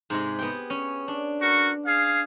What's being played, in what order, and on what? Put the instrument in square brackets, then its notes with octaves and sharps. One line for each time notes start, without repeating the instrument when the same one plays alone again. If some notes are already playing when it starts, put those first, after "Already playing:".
[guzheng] G#2 C3 G#3
B3 G#4 G5
C#4
D4
[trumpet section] F#4 A#4 C#6
G#4 F5